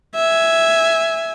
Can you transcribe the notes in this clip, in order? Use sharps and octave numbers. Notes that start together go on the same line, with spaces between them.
E5 G#5